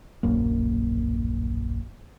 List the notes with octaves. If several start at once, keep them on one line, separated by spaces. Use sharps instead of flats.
D1 A#1 F#2 A#3